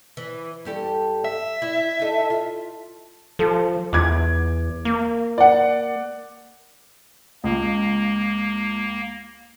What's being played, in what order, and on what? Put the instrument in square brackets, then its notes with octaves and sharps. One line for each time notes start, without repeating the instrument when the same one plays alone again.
[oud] E3
G2 G4 A4
[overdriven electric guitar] E5
[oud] E4
D#4 A4
F4
[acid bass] F3 [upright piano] A4
[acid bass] E2 [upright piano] D6 G#6
[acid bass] A#3
[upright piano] D5 F#5
[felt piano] C#2 [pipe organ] A#3